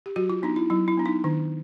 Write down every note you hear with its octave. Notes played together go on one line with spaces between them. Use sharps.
G4
F#3 F#4
F4
B3 D4 D#4
E4
F#3 E4
E4
B3 D4
D#4
D#3 D4